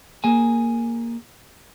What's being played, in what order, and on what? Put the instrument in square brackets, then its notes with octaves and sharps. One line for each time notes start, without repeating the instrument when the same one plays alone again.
[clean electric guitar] A#3 G#4 G#5